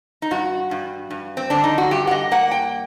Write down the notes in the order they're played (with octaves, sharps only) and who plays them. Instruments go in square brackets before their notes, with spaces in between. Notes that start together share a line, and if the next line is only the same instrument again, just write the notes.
[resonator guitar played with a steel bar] D#4
G2 F#4
G2
G2
C4
D3 D4
D#4
F#4
G2 G4
F#5
D#5
A#3 F#5
G5